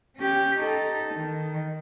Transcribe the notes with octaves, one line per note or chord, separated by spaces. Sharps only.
C#4 G4
D#4 A4
D#3